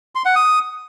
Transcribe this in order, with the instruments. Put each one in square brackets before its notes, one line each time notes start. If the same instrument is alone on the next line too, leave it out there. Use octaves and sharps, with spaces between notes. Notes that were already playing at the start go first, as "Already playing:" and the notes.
[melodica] C6
F#5
D#6